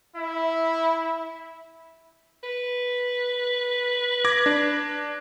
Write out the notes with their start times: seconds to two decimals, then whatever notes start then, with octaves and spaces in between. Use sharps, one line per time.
0.16 E4 E5
2.43 B4
4.25 D6 G#6 A#6
4.46 D4